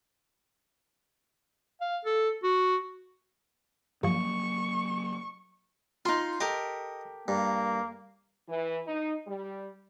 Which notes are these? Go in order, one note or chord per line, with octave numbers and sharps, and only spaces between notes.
F5
A4
F#4
G2 F3 F#3 A#3 C#6
D#4 F4 C6
G4 A4 A#4 D#5
G2 A#3
E3
D#4
G3